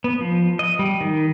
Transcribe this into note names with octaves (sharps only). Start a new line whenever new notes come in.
B3
F3
D#5
G3
D#3